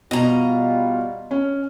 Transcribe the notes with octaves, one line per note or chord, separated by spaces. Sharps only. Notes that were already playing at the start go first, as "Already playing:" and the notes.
B2 G3 F4 D#5 A#5
C#4